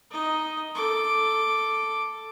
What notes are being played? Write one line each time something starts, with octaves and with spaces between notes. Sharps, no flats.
D#4 D#5
A4 D6